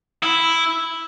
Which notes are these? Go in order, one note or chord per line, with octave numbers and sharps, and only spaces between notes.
E4